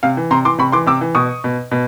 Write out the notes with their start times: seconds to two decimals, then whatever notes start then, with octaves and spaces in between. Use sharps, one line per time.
0.03 C3 F5
0.17 E3
0.31 C3 A#5 C6
0.45 E3 C6 D6
0.58 C3 B5 C#6
0.72 E3 C6 D6
0.86 C3 D6 E6
1.01 E3
1.15 B2 C#6 D#6
1.44 B2
1.71 B2